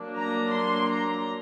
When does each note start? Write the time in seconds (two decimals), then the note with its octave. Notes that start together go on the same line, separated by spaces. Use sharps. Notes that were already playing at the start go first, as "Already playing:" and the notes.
Already playing: F#3 A#3 D4
0.17 A#5
0.54 C6
0.91 A#5